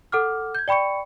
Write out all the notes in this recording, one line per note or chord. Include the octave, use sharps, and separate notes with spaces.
A4 F#5 D6 F6
G6 G#6
D5 G5 B5 C#6 C#7